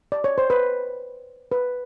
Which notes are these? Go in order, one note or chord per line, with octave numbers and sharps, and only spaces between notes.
D5
C#5
C5
B4
B4